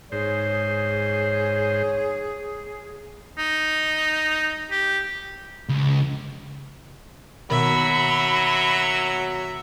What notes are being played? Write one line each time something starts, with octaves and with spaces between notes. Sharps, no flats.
G#2 G#4 C5 C#5
D#4
G4
C#2
B2 D#3 F#3 A#4 E5 B5